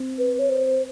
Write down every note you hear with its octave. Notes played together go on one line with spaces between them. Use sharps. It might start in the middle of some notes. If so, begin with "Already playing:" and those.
Already playing: C4
B4
C#5
C5